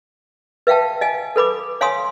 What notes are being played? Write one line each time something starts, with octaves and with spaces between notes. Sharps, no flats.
B4 E5 F5 G5 A5
D#5 F5 G#5
A4 B4 B5 D6
C#5 F5 G#5 A#5 C6 D#6